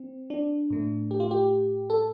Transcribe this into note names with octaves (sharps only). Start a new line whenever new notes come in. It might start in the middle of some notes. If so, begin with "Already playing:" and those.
Already playing: C4
D4
A2 A3
G4
F4
G4
A4